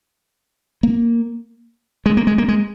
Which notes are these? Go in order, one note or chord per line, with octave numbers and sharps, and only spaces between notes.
A#3
G#3
A#3
G#3
A#3
G#3